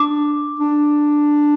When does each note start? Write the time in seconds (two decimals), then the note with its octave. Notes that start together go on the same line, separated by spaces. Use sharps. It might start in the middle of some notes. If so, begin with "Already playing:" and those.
Already playing: D4 D6
0.60 D4